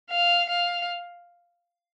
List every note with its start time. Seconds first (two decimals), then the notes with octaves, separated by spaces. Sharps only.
0.10 F5
0.49 F5